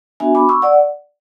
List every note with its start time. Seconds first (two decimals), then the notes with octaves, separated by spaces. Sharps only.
0.20 B3 D4 F#4 E5 G#5
0.35 B5 D6
0.49 C#6 E6
0.62 D5 F#5